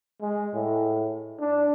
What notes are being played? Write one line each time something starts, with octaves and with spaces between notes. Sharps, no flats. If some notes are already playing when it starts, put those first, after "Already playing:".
G#3
A2
D4